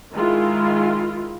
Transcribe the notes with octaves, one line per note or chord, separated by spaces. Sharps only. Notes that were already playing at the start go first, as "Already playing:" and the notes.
D#3 G#3 E4 F4